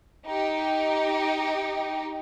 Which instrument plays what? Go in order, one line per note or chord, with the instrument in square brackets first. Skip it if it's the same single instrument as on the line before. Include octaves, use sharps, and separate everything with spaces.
[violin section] D#4 G4